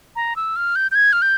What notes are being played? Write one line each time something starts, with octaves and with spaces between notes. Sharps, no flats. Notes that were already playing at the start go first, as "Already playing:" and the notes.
A#5
E6
F6
G6
G6
G#6
F6
G6